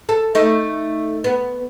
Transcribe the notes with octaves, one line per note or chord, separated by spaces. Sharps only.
A4
A3 D#4
B3